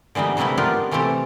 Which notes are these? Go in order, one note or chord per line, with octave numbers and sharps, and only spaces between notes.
D3 E3 G3 B3 D#4
C3 G3 A3 D#4 E4 B4
B3 D4 D#4 F4 G4 A#4
C3 E3 A3 C4 G4 A4